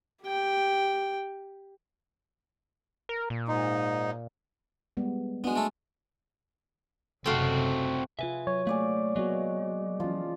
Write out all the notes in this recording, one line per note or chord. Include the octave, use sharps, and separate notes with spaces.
G4 G5
A#4
A#2
G#2 D#4
G3 G#3 B3
G#3 B3 D4 F#4
G#3 A3 A4
F#1 C3 A3 C4 F4 F#4
C3 F4 G#4 B4 E5
F#3 C#5
A3 A#3 G#4 D5 F5
F#3 G#3 A#3 B3 F#4
E3 F3 C#4 F4